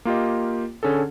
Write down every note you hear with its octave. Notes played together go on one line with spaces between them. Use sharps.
A#3 F4 G4 D#5
D3 C#4 G#4 A4